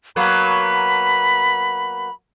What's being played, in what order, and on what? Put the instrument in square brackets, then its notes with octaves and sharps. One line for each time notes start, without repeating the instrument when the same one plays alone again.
[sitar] F#3 A#3 B3 [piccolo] B5